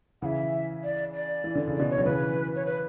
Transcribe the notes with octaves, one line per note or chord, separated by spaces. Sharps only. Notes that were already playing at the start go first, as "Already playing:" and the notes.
C#3 E3 E5 F#5
D5
D5
E3
D3
C#3
B2 D3 D5
C#5
F#3
C#3 E3 B4
C#5
B4